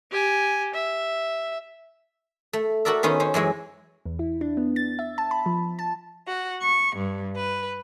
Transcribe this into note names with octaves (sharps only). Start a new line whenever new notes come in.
G4 G#5
E5
A3
F#4 A4 A#4 D5 E5
D#3 B3 C#4 D#4 C5
C#4 C5
F#2 E3 G#3 C#5
E2
E4
D4
B3
A6
E5
A5
B5
F3
A5
F#4
C#6
G2
B4